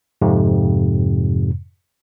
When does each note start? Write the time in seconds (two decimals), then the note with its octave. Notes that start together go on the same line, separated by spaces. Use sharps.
0.22 F2 G#2 C3